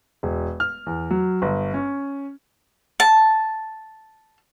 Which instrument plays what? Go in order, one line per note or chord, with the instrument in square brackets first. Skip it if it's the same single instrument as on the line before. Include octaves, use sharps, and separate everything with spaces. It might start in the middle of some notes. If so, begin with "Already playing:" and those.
[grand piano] E1
F6
E2
F#3
G1
C#4
[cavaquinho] A5